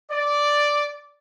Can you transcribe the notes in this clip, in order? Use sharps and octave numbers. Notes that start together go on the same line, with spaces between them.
D5